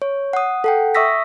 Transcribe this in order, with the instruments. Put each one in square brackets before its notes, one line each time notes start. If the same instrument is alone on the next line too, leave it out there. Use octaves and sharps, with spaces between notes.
[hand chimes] C#5
F#5 D#6
A4 F#5 G5
E5 C#6 D#6 E6 A#6 B6